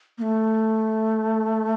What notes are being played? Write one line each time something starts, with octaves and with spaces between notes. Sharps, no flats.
A#3
A3